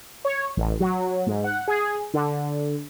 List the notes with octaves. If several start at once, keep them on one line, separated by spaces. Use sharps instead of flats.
C#5
A1
F#3
G#2
F#5
G#4
D3